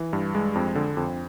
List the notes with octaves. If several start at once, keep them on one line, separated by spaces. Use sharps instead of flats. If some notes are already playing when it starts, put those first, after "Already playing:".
Already playing: E3
G2
G#3
F2
D3
F2